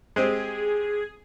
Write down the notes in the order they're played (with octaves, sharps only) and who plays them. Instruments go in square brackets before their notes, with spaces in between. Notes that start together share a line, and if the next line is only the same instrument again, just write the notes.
[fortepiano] G#3 C4 G4 [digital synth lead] G#4